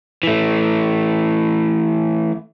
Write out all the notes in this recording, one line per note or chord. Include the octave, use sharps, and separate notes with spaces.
E3 A3